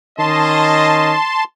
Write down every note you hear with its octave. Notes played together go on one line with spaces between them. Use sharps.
D#3 C#4 D#5 A5 C6